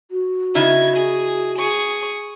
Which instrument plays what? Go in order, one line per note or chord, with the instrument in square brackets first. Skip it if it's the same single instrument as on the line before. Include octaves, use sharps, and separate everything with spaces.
[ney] F#4
[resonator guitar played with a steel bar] C#3 D#4 E4 [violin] G#6
[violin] G#4
G#4 C#6